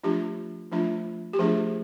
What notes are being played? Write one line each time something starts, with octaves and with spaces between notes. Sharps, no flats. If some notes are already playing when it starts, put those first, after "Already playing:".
F3 A3 D4 F4 G4
F3 A3 D4 F4
G4
F3 A3 D4 F4 G#4